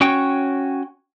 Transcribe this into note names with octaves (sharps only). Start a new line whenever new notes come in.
C#4 F#4 C#5 G5